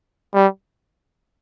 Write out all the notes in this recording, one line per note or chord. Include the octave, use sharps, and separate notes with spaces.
G3